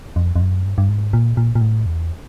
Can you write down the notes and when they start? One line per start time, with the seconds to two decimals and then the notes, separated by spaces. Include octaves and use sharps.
0.16 F2
0.36 F2
0.41 F#2
0.65 G2
0.78 G2
0.89 G#2
1.13 A#2
1.37 A#2
1.55 A#2
1.61 A2
1.86 E2